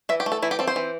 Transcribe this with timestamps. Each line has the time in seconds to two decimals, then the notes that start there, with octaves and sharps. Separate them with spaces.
0.09 E3 E5
0.20 G4
0.26 A3
0.32 A4
0.42 E3 E4
0.51 G4
0.59 C4 A4
0.67 C5
0.76 E3